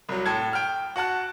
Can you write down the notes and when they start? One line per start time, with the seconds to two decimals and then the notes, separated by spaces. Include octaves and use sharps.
0.09 C2 F#3
0.26 A2 A4 G#6
0.53 G5 F6
0.96 F#4 F#5 A5 F#6